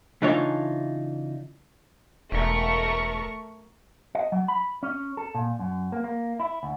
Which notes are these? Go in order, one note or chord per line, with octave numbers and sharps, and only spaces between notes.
C#3 E3 D4 D#4 F4 C#5
E1 A3 A#4 C#6
D#5
F#3
B5
C#4
A4
A#2
F#2
A#3
A#3
E4
D2